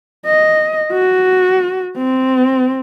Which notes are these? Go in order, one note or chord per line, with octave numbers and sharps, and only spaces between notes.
D#5
F#4
C4